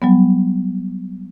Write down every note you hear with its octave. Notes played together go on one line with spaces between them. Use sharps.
F#3 G3 B3